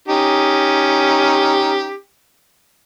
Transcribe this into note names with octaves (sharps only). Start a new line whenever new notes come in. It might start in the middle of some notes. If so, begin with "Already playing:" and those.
C#4 D#4 G4